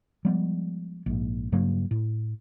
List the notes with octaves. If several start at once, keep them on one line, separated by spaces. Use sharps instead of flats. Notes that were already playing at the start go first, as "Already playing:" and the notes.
F3 G3 G#3 B3
A#1 G#2
G2 C#3 F#3 A#3
A2